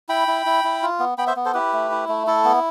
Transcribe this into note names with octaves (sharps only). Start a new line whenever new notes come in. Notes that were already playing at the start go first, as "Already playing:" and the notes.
E4 G5 B5
E4
E4
E4
F4
B3
B3 G5 B5
C5 E5
B3
A4 C5
E4 G4 B4
A3
E4
A3
E4 A4
B3